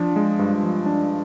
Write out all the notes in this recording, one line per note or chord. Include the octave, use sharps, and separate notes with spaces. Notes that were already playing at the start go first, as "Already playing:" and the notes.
Already playing: F3 D4
G#3
G2
F3
D4